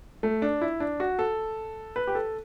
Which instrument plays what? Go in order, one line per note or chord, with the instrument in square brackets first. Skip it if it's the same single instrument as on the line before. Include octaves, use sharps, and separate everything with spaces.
[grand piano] A3
D4
E4
D4
F#4
A4
B4
G4
A4